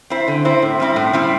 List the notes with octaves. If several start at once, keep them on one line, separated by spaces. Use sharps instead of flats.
C4 E4 C5
D3
C4 E4 C5
A2
G3 C4 E4
A2
G3 C4 E4